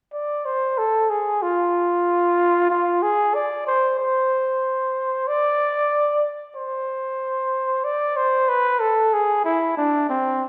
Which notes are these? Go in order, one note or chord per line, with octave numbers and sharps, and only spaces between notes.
D5
C5
A4
G#4
F4
F4
G#4
D5
C5
C5
D5
C5
D5
C5
B4
A4
G#4
E4
D4
C4